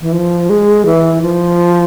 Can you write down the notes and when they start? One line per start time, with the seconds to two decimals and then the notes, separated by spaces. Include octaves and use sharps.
0.01 E3
0.13 F3
0.50 G#3
0.86 E3
1.22 F3